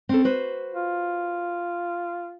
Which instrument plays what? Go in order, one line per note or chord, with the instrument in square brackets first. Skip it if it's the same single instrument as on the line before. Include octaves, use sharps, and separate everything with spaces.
[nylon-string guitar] C4 C#4 A4
F#4 B4 C5
[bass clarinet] F4